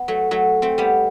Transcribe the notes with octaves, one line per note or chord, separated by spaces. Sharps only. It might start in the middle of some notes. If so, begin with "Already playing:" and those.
Already playing: B3
F#3 A3
F#3 A3
A3 C4
G3 B3